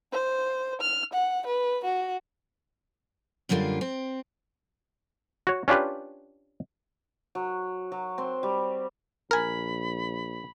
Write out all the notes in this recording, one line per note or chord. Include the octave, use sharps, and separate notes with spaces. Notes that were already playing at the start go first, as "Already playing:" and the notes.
C5
F6
F#5
B4
F#4
F#2 D3 G3 A#3 F4
C4
F#4 C#5
C#4 D4 F4 G4 B4
F#3
F#3
C4
G3
A#1 A#4 G#5 B5